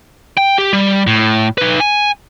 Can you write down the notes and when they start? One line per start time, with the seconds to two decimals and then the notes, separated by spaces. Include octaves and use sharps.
0.37 G5
0.58 G4
0.73 G3
1.07 A2
1.58 D#4 B4
1.80 G#5